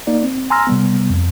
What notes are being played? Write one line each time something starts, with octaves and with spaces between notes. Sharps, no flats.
A#3 D#4 D5
C4
G#5 A#5 C6 E6 F6 A#6
C3 G3 B3
F2